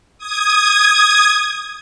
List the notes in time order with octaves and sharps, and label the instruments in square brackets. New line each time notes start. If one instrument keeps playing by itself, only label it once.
[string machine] D#6 G#6